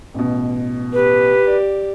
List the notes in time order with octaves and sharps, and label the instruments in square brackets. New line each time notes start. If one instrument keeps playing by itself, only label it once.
[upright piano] A1 B2
[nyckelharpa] G4 [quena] B4
[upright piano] D5